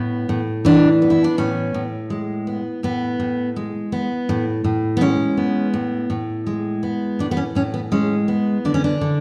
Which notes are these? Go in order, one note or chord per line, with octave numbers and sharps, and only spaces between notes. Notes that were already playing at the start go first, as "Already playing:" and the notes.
Already playing: A2 B3
A2
E3 D4
B3
E4
D4
A2 C#4
A2
G#3
B3
A2 B3
A2
G#3
B3
A2
A2
B3
G#3 C#4
B3
A2
A2
G#3
B3
A2 D4
B3
C#4
A2 C#4
B3
G#3 C#4
B3
D3 D4
C#4
D4
D3